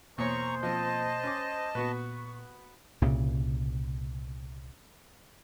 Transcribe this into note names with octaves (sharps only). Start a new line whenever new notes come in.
E2 B2 A#3 C5 C#5 A#5 C#6 D#6
F3 C4 D#5 A5
C#4 D6
A#2 B3 F#4 B4 C#6
C2 A#2 C#3